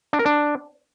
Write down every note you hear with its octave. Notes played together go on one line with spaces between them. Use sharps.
D4
A#4
D4